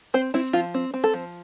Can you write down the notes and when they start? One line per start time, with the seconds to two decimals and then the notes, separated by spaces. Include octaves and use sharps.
0.14 C4 C5
0.34 C4 E4
0.53 F3 F4
0.74 C4
0.94 C4
1.04 A4
1.14 F3